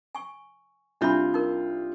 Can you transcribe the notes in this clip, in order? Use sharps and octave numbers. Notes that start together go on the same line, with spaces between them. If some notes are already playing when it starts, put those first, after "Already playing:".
G#5 C#6
C2 D4 F4 E5 B5 G6
D#4 A#4